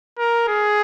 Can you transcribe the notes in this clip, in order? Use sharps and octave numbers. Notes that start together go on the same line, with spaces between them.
A#4
G#4